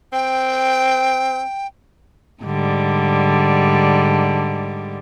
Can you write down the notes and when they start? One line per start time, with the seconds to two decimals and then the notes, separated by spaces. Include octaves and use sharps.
0.13 C4 G5
2.43 G#2 D3 G3